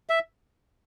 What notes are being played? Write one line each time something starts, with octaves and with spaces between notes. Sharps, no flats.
E5